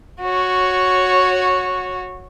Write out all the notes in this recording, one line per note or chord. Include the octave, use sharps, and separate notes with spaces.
F#4 C#5